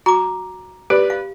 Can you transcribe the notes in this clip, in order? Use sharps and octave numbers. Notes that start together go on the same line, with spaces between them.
F#4 A#5 D6
G4 B4 D5
F5